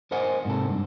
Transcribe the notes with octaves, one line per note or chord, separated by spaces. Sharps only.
A#4 C5 D#5 F#5 G#5
G#2 C3 A4
G2